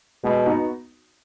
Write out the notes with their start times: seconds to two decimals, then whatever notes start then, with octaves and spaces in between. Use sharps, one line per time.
0.24 B2 G#3
0.46 B3 D#4 F#4